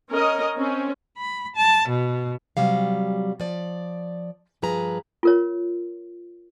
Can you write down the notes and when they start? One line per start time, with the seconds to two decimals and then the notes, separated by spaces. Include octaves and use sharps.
0.10 C#4 A#4 D#5
0.56 C4 C#4
1.19 B5
1.57 A5
1.88 B2
2.57 C3 F#3 G3 F5
3.40 F3 D5
4.62 G2 F3 G#4 B4 A#5
5.23 F4 A#4 C#5